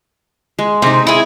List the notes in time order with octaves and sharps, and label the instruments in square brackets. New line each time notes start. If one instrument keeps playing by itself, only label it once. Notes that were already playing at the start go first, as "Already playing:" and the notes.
[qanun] G#3
[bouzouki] C3 [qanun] C4 D#4
[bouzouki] E4 G#4